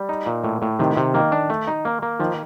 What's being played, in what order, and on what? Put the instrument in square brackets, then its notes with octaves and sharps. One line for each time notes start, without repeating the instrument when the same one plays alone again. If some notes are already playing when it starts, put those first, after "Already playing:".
Already playing: [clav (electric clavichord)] G3
D#4
A#2
A2
A2
[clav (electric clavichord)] C3 [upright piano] D#3
[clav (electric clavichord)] C3
[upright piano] D#3 [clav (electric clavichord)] A#3
[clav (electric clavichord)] D4
A3
D#4
A#3
A#3
[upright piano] D#3 [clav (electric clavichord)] F3